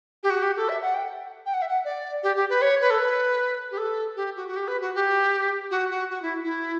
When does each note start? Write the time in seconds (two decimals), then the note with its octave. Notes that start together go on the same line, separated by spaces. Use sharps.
0.23 G4
0.30 F#4
0.42 G4
0.56 A4
0.69 E5
0.82 F#5
0.94 G5
1.46 G5
1.53 F#5
1.62 E5
1.68 F#5
1.84 D5
2.23 G4
2.36 G4
2.49 B4
2.61 C#5
2.81 B4
2.90 A4
2.98 B4
3.71 G4
3.77 A4
4.16 G4
4.36 F#4
4.48 F#4
4.56 G4
4.67 B4
4.81 F#4
4.94 G4
5.71 F#4
5.90 F#4
6.10 F#4
6.22 E4
6.44 E4